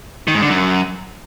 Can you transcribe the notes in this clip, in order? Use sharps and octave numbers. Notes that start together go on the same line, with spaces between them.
D#3
G#2
D3
F#2